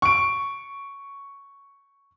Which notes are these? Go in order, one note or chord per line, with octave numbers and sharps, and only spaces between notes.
C#6 D7